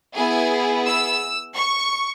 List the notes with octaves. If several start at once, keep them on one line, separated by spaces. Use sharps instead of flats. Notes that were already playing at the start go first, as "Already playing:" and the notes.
B3 E4 G#4 G#5
E6
C#6